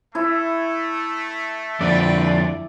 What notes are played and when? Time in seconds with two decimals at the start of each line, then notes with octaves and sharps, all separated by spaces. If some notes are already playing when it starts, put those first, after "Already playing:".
0.15 A3 E4
1.81 F2 D3 C4 B4 D5